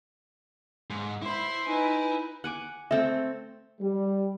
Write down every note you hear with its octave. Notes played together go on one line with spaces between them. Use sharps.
G#2
E4 C5 B5 C6
D#4 B4 G#5
F#5 G#5 D6
A3 C4 A4 E5
G3